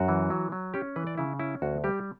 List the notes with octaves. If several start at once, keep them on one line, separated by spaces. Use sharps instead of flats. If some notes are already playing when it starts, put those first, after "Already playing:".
Already playing: F#2 F#4
E3
F#3
F#3
C#4 G4
E3 B4
D5
C#3 E4
C#4 E4
D2 F#4
G3 G4